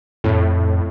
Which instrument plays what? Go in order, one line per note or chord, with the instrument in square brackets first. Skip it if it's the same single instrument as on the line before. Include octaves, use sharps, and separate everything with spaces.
[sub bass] F2 [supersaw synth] A2